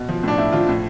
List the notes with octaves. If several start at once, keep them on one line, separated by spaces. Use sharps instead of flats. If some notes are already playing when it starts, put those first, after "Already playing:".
Already playing: B2
F3
A2 D4
A2 E4
F3 F4
A2